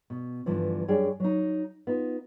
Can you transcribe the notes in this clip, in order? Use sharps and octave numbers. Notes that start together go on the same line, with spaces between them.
B2
G2 D3 E3 F3
F#2 G3 D4 G#4 C#5 G5
F#3 D#4
B3 D#4 F4